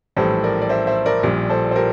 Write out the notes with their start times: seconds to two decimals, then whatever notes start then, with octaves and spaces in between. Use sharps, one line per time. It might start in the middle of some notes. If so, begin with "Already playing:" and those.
0.17 A#1 A2 E3 G3 A4 C5
0.44 A#4 D5
0.62 D5
0.69 C5 E5
0.87 C5 E5
1.06 A#4 D5
1.23 A#1 A#2 G3
1.49 A4 C5
1.71 C5
1.76 G4 A#4